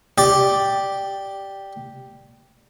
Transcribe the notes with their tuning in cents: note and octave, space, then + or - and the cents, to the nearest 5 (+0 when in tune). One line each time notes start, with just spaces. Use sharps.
G4 +0 D5 +0